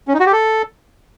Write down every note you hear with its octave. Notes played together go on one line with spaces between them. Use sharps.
C#4
D#4
F#4
G4
A4